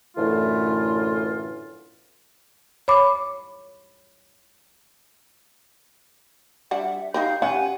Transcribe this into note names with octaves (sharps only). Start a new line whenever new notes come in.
F#2 A2 D3 E3 A3 F4
C#5 B5 D6
G3 D4 E5 F#5
D#4 G4 A#4 F5 G6
C#4 G4 F#5 G#5